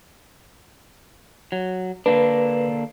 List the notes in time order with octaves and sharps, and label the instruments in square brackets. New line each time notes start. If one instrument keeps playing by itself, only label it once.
[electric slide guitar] F#3
[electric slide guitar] D3 A#3 D4 [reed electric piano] B4